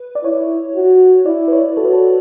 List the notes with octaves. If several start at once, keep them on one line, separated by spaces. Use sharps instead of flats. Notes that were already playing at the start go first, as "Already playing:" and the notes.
Already playing: B4
D5
E4 C#5
F#4
E4 D5
B4
C#5
F#4 A4
B4
A4